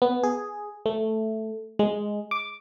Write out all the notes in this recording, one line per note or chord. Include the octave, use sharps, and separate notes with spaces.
B3
G#4
A3
G#3
D6